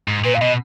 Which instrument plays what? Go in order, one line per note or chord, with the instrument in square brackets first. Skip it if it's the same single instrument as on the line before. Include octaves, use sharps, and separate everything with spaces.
[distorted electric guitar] G#2
[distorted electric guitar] A#2 [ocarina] B4
[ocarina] F5
[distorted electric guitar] B2 [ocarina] D#5